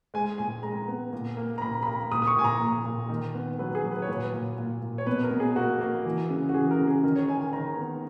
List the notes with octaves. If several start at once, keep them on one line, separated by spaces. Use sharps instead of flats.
G#3 G#5
A#2 G#5
G#3 A#5
B3
A#2
A#3
A#5
A#2 B5
B5
A#3 A#5
A#2 D#6
D#6
C#6
A#2 G#5
A#5
A#2
A#2
D#3
B3
F#3 B4
G#4
F#3
B4
C#5
A#2 B4
A#2
A#2
A#2
C#5
B2 B4
A#4
B2
G#4
A#3 F#4
A#3
E3
C#3
F#4
E3 G#4
A#4
C#3
G#4
D#3 A#4
C#5
D#3 G#5
G#5
D#3 A#5
B3